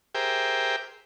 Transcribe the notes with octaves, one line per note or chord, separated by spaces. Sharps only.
G4 G#4 A#4 C5 E5 G5